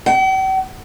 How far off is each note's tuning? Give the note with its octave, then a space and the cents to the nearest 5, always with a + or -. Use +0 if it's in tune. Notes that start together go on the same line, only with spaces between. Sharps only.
G5 -45